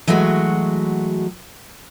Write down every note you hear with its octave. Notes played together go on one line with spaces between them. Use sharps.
E3 F#3 G#3 A3 F#4